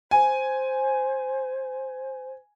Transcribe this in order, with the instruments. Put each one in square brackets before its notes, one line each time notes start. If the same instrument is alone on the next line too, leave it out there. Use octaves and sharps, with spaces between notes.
[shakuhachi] C5 [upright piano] G#5